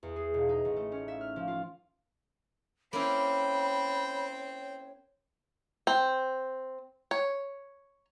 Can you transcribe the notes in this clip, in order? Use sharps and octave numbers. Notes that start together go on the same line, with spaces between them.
E2
G#4
E1
D#4
A1
A3
C#4
E5
F6
F3
F4
A#3 C4 C#4 E4 C#5 G5 B5
C4
C#5